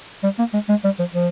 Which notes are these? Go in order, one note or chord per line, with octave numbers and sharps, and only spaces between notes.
G3
A#3
G#3
G#3
G3
F3
F3